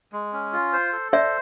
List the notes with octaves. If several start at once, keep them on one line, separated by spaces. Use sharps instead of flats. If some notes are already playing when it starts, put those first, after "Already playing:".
G#3
C#4
F4
C5
A4
C5 D5 E5